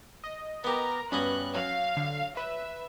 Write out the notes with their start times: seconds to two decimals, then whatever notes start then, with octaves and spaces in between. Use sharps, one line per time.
0.24 D#5
0.64 B3 G4 A#4 A#5
1.12 G2 B3 C#4 F#4 F#6
1.55 F#3 F5
1.97 D3
2.37 B4 E5